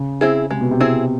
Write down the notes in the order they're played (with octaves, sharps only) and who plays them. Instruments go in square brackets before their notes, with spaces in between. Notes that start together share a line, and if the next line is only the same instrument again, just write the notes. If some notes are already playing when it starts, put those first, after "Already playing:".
Already playing: [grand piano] C#3
[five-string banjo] C4 E4 G#4
[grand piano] C3 [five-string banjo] G#3
[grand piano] B2
C3
[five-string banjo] C4 E4 G#4